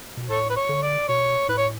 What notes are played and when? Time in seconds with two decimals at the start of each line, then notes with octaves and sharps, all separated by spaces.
0.17 B2
0.29 A2 A4 C#5
0.49 B4
0.56 C#5
0.69 D3
0.83 D5
1.08 B2 C#5
1.48 A2 B4
1.57 C#5